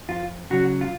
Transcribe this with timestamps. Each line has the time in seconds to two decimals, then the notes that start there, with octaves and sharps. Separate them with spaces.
0.09 F2 F4
0.50 C#3 F#3 F#4
0.81 F4